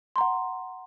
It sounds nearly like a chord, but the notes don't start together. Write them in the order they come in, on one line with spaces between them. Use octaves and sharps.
C6 A#5 F#5